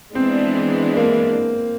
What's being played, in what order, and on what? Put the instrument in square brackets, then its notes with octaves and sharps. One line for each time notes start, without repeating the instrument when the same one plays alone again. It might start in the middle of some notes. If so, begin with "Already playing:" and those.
[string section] E3 G#3 B3 D4 [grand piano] C4
[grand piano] A#3